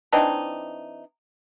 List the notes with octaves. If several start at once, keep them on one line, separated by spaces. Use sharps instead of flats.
E3 C4 D4 D#4